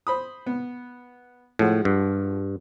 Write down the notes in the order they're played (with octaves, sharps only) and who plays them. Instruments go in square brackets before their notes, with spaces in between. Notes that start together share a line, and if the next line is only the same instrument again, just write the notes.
[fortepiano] C5 B5 D#6
B3
[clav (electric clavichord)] A2 [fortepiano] F3 G#3 F#5
[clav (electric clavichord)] G2